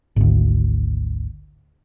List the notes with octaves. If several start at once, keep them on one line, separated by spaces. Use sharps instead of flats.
G#1 D2